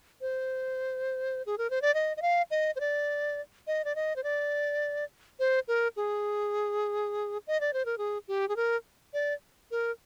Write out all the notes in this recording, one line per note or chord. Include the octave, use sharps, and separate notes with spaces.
C5
G#4
A#4
C5
D5
D#5
D#5
F5
D#5
C5
D5
D#5
D5
D#5
C5
D5
C5
A#4
G#4
D#5
D5
C5
A#4
G#4
G4
G#4
A#4
D5
A#4